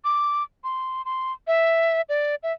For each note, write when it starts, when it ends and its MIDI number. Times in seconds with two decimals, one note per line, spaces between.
0.05 0.43 86
0.64 1.04 84
1.05 1.32 84
1.47 2.01 76
2.09 2.35 74
2.43 2.52 76